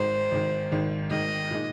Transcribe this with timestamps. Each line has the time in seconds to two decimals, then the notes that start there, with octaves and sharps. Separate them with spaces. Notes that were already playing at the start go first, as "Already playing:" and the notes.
Already playing: G#1 G#2 D#3 C5
0.31 G#1 G#2 D#3
0.72 G#1 G#2 D#3
1.10 G#1 G#2 D#3 D#5
1.51 A#2 G#3 D#4